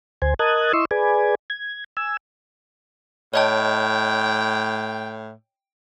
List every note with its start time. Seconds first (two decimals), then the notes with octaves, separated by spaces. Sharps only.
0.22 D2 C5 G#5
0.39 A#4 D#5 A5 D#6 F#6 G#6
0.73 E4 D#5 C6 C#6 E6
0.91 G#4 B4 D5 G#5
1.50 G#6
1.97 G#5 E6
3.34 A2 C#5 D#5 G5 A5